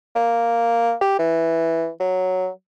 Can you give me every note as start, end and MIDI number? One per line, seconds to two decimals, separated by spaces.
0.16 0.93 58
1.01 1.16 67
1.19 1.90 52
2.00 2.48 54